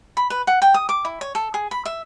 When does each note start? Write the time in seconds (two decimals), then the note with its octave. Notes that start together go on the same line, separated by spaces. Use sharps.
0.17 B5
0.30 B4
0.47 F#5
0.62 G5
0.74 D#6
0.89 D6
1.05 E4
1.21 C#5
1.35 A4
1.54 G#4
1.71 B5
1.85 E5